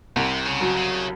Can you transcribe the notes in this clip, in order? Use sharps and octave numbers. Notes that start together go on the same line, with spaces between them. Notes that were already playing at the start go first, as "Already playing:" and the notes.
C2 C3
C#3
F#3
C#3